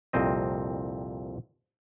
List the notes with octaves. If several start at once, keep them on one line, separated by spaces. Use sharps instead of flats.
C2 F2 A#2 C4 D#5